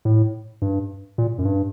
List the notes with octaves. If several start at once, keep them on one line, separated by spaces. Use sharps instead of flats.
A2
G2
A#2
F#2
G2